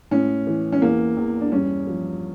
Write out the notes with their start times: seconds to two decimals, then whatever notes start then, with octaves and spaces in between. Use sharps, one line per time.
0.11 A2 C#4
0.47 E3
0.72 C#4
0.82 E2 A#3
1.17 E2
1.41 D4
1.52 G2 C#4
1.87 F3